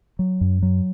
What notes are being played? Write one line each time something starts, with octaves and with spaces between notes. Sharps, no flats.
F#3
F#2
F#3